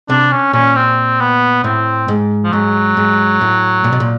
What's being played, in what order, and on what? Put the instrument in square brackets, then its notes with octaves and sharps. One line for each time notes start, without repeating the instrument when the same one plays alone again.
[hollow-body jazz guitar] C3 [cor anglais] D4
[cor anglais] C#4
[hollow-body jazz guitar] A#2 [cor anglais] C#4
[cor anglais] C4
B3
[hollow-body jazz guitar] A2 [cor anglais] C4
[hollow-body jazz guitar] G#2
[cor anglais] F3
[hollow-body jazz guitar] G#2 [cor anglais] F#3
[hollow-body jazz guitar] G#2
A2
A#2
B2
A#2